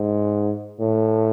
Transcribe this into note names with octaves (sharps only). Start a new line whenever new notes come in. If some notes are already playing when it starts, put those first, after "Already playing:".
Already playing: G#2
A2